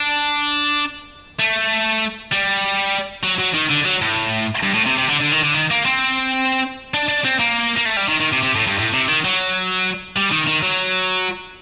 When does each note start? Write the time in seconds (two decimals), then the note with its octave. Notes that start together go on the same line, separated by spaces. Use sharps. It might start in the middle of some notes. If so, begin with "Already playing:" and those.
Already playing: D4
1.39 A3
2.32 G3
3.24 F#3
3.40 F#3
3.55 D#3
3.70 D3
3.85 F#3
4.02 A2
4.63 G2
4.74 A2
4.86 C3
4.98 C3
5.09 D3
5.21 D3
5.32 D#3
5.44 D3
5.54 D#3
5.71 A#3
5.85 C4
6.94 D4
7.08 D4
7.25 C4
7.39 A#3
7.77 A#3
7.86 A3
7.97 G3
8.09 D#3
8.20 D#3
8.32 C3
8.43 C3
8.55 A2
8.67 G2
8.79 A2
8.93 C3
9.08 D#3
9.25 F#3
10.17 G3
10.32 D#3
10.47 D#3
10.62 F#3